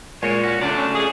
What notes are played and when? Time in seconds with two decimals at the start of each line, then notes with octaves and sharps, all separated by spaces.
0.23 A#2 G#3 C#5
0.43 C#4 F#4
0.61 C#2 F#3 A3 D4 A4 D5
0.78 C#4
0.94 F2 G#4